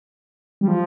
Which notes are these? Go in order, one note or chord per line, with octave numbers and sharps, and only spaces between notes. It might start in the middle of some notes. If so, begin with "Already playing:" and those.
G3
F3